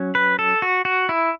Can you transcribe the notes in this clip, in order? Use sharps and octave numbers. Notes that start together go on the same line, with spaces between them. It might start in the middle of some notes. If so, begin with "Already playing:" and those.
Already playing: F#3 C#4
B4
A4
F#4
F#4
E4